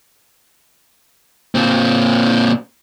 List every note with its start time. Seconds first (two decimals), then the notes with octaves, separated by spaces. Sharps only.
1.55 A#2 C4